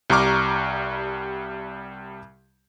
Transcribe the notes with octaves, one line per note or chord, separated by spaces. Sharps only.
C2 G3 A#5 C#6 D6 F6